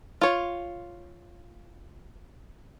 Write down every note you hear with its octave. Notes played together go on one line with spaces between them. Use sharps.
F4 C#5